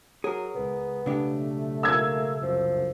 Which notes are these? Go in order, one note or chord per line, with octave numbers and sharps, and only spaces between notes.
F#3 G#4 A#4
C#2 B3
B1 C#3 A3 D4 G4
A#3 E6 G#6
C2 F#2 F3